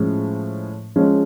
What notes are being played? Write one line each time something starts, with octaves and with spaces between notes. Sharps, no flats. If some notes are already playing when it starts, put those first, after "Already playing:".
Already playing: A2 F3 G#3 C#4
F3 G#3 C#4